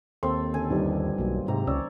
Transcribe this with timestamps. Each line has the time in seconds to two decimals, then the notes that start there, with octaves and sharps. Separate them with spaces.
0.23 D#2 C4 A4 C6
0.54 D3 C#4 A4 G#5
0.70 G1 D#3 G3 D#4
1.18 B1 F#3 A#3
1.48 G#2 C3 A#5
1.67 C#2 C#4 C#5 D5 E6